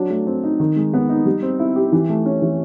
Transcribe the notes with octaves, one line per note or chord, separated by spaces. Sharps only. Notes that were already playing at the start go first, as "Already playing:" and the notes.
Already playing: F#3 D4
A3
C4
D#4
D#3
G#3
B3
D#4
G3
C4
E4
G4
E3
A3
C#4
E3